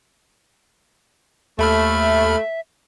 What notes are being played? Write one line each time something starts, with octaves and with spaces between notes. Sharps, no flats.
D#2 A3 E5 B5 F6